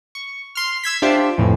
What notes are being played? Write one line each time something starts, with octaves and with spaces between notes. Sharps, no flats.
C#6
C6 F6
E6 G#6 B6
D4 F4 G4 C5 E5
F2 A2 E3